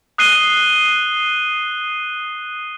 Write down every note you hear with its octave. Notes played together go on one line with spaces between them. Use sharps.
D#6 F#6 C7 D#7 G7